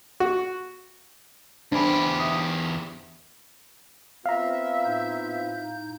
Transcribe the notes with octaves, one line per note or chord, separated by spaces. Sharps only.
F#4
E2 D4 G4 C5 G#5 B5
E5 D#6
B3 C4 F4 E5 F5 A#5
A2 D#4 G6